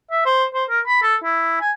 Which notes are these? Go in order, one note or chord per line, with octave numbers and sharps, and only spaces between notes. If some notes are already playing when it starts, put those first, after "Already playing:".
E5
C5
C5
A#4
B5
A4
E4
G#5